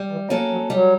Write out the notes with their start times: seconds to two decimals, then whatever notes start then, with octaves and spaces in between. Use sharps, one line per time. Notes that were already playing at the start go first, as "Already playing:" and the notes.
Already playing: G3
0.11 E3
0.30 F#3 A#3 C#4 F#4 A4
0.51 F#3
0.70 F#3 G3